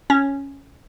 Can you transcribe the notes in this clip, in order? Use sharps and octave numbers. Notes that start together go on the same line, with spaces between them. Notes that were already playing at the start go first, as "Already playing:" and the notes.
C#4